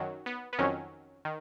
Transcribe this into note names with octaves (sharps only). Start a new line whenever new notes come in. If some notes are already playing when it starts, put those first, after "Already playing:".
Already playing: F#2 D#3 F#3
B3
B3
F2 D#3 F#3 C#4
D#3